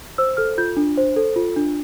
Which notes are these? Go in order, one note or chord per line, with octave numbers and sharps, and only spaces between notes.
C5 E6
A4 F6
F4 G6
D4
C5
A4
F4
D4